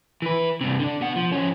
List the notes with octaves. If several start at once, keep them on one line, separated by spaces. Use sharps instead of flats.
E3 B4
G2 C3
D3 D4
B2 F#5
F3
F3 C#4